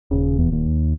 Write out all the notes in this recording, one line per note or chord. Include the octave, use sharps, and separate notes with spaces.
D#1 C#3
E2
D#2